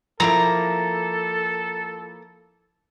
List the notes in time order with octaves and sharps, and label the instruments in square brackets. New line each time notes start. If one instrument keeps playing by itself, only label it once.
[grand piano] F3 E4 [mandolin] A#3 C4 A#5 [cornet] A4